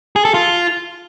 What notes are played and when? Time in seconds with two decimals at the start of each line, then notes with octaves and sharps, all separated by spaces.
0.16 G#4
0.25 A4
0.34 F4